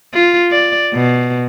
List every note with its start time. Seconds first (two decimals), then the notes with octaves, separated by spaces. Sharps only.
0.14 F4
0.51 D5
0.94 B2